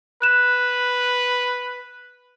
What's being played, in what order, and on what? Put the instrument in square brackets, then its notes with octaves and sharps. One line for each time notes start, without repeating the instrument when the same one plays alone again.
[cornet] B4 [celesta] F#6 E7